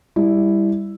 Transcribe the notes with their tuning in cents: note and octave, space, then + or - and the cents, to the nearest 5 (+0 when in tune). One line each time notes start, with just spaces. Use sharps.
G3 +20 E4 +0